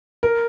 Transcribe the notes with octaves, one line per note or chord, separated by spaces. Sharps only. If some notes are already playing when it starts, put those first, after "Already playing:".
A#4